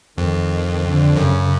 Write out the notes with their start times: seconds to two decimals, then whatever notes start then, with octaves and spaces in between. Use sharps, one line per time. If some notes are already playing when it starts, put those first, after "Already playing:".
0.17 F2 D#3
0.84 D3
1.16 F#2 C#3